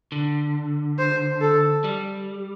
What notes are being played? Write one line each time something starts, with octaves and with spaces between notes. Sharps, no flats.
D3
C5
A4
G3